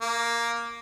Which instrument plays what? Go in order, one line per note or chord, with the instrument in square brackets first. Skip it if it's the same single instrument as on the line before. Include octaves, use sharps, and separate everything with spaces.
[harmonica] A#3